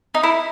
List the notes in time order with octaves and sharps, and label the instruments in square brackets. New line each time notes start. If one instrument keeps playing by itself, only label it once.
[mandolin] D#4
E4